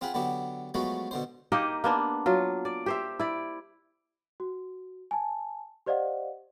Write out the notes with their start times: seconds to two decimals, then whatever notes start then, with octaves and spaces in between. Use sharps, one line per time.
0.01 C4 F4 G#4 F#5 B5
0.14 D3 F#3 B3 E4 G4
0.74 F3 F#3 G#3 A3 B3 F#4
1.11 B2 D3 C5
1.52 A#3 D#4 G4 D#5
1.84 A#3 B3 D4
2.26 F#3 F4
2.65 D5
2.86 G4 C5 E5
3.20 E4 D5
4.40 F#4
5.11 G#5 A5
5.86 G4 C5 D5 D#5 F5 F#5